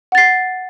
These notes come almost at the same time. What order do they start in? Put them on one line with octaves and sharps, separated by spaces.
F#5 A6 C7